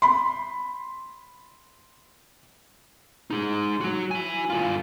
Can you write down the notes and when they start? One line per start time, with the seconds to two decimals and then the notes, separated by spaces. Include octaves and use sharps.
0.02 B5 C6
3.30 D#4 G#4
3.81 F#3 F#4
4.11 E4 G#5
4.50 G2 F4